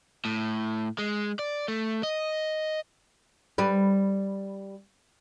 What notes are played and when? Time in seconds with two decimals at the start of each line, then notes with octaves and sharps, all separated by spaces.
0.25 A2
0.98 G#3
1.39 D5
1.68 A3
2.03 D#5
3.58 G3 B4